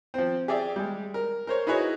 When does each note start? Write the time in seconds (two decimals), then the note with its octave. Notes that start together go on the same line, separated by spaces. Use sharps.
0.14 F3 C4
0.48 G4 G#4 D5 E5
0.76 G3 G#3
1.14 A#4
1.47 A#4 C5 C#5
1.67 D#4 E4 F#4 G#4 B4 C#5